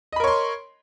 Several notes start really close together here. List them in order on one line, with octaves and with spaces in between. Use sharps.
D#5 B5 A#4 C#5 C6